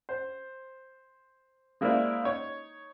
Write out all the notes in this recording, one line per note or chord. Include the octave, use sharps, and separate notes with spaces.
C5
G#3 A#3 E4 C5 D5 E5
D#4 C#5